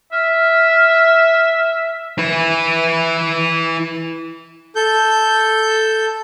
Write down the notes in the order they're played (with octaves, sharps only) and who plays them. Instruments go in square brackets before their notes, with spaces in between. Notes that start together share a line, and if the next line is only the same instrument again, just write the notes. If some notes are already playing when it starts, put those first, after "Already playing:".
[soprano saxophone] E5 [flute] F6
[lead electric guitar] E4 B4
[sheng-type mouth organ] A4 G6